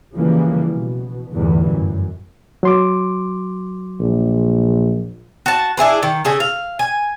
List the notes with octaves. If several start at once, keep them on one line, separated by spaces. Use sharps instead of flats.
C#3 E3 F3 G3 A#3
B2
G1 E2 A2 E3 G3
F#2
F#3 C6 D6
A#1
F#4 A5
D4 E4 G#4 B4
D#3
C#3 G#4 A4
F5
G#5